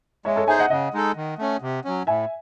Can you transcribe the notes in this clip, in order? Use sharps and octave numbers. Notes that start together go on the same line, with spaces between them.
G#3 C#5 E5
A4 C#5
D#4 G#4 C5 E5 G#5
D#5 F#5
C#3 D#5 F#5
G#3 D#4 A4
D#3
A3 C#4
C3
F#3 C#4
A2 E5 G#5